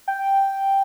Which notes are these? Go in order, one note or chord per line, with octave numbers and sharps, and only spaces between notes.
G5